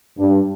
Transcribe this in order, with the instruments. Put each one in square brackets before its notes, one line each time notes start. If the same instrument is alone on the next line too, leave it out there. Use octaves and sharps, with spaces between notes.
[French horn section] G2